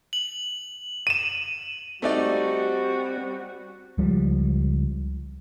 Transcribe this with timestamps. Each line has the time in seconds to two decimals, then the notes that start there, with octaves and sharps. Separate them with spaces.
0.13 F#7
1.07 D#7 E7
2.02 G3 A3 C4 D#4 F#4 D5
3.98 C#2 F3 G3